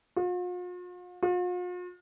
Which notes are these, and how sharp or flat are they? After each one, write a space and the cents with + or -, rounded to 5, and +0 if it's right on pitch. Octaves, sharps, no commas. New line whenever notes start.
F4 +45
F4 +45